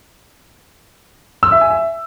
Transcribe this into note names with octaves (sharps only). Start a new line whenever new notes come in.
E6
E5
G#5
E5